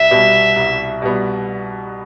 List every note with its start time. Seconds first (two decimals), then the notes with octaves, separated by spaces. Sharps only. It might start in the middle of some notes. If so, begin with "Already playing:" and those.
Already playing: C2 E5
0.11 B2 G3 B3
0.56 C2
1.02 B2 G3 B3